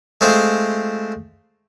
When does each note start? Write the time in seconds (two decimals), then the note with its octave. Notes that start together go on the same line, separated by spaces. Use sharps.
0.21 G#3 A3 C4 F4 C5